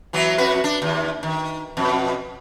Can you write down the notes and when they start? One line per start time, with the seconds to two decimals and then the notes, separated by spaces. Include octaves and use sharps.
0.13 E3 F#3 B3
0.38 F2 F#4 B4
0.64 D4
0.82 D#2
1.23 D#3
1.77 F2 B2